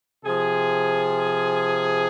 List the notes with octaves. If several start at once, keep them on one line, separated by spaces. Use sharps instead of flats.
C3 F3 G#4